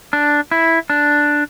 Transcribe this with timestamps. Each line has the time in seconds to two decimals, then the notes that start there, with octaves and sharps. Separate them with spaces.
0.13 D4
0.51 E4
0.90 D4